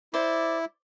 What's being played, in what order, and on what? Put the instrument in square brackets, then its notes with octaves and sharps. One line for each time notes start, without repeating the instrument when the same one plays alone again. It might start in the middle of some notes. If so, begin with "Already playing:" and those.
[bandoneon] E4 [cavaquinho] C5 D5